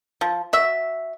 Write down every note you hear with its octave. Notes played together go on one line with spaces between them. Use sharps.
F3
F#4 E5